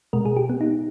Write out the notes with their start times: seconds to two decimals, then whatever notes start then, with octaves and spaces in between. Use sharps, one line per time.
0.13 B2 G#3 A#4
0.26 G#4
0.37 G4
0.50 B3
0.61 D#4